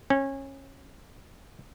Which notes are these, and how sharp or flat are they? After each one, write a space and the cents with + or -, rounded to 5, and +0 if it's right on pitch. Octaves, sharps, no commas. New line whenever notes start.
C#4 -25